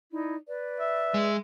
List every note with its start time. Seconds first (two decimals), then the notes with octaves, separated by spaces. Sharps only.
0.12 D#4 E4 D5
0.48 B4 D5
0.80 E5
1.14 G#3